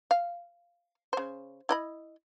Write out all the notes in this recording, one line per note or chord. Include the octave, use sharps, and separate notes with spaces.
F5
C#3 C5
E4 D#5 B5